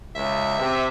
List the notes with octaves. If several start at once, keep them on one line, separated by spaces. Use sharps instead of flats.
C#2 E5
C3